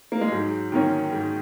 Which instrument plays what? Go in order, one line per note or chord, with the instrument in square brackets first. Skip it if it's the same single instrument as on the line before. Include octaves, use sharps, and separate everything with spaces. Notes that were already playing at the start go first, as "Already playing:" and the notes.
[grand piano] A#3
G#3
[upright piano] G#2 [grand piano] F#3
[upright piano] D#3 A#3 C#4
G#2